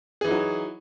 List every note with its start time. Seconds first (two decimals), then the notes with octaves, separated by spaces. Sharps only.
0.21 G#4
0.24 E3
0.28 D#4
0.31 F#3